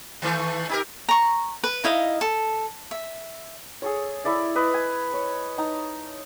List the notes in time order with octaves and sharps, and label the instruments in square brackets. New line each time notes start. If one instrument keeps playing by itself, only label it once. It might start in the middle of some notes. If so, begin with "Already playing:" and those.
[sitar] D#3 E3 A3
D#4 G4 A#4
[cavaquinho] A#5 C#6
B4
D#4 E4 D#5 F5
A4
E5
[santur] G#4 A4 C#5
E4 A4 D5 E5
B4 D#5
G#5
C#5
D#4 A5 A#5